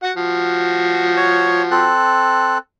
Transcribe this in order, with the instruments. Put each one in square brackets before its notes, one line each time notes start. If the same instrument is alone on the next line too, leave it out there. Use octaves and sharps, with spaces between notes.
[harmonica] F#4 F#5
F3 F#4
[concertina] C#5
C4 A4 F#6